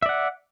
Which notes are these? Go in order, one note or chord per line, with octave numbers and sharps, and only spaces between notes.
D5 E5 F#5